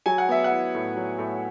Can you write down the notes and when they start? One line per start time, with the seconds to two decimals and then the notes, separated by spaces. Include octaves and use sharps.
0.06 F#3 G#5
0.18 F#5
0.29 B3 E5
0.44 F#5
0.51 E4
0.75 A2
0.97 F#3
1.19 A2